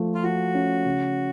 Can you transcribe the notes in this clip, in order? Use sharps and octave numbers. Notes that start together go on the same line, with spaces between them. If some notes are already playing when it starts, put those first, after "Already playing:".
Already playing: F3 A3
F4
F3 F#4
C#4
C#3